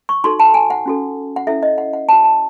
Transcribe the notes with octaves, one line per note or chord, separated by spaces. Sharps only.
C#6
D#4 F#4 A4 C6
A5
G#5
F#5
C#4 F#4 A4
F#5
C#4 E4 A4 E5
D#5
F#5
F#5
F#4 C#5 A5
A5